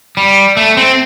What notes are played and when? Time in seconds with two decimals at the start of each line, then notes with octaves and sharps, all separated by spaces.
0.17 G3
0.57 A3
0.77 C4